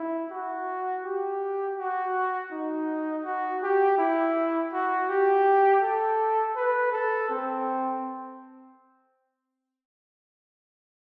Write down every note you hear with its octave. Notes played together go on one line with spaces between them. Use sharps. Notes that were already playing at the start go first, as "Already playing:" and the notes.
Already playing: E4
F#4
G4
F#4
D#4
F#4
G4
E4
F#4
G4
A4
B4
A4
C4